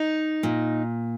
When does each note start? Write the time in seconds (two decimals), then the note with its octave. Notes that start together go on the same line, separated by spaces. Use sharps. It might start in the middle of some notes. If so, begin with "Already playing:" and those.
Already playing: D#4
0.43 A#2